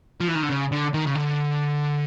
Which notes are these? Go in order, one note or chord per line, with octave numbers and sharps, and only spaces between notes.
F3
E3
D#3
D3
C#3
D3
D#3
C#3
D3